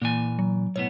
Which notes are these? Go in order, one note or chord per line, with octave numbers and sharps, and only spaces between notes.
A#2 E3 A#3 G#5
F#3
B1 A2 B3 C#5